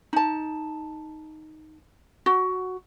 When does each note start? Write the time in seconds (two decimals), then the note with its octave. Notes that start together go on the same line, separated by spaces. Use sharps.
0.13 D#4 A5
2.26 F#4